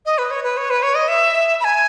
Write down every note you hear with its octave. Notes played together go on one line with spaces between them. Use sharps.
D#5
B4
C#5
B4
C#5
B4
C#5
D#5
E5
B5
G#5